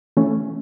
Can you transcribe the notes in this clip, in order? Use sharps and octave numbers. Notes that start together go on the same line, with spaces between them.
E3 A3 C#4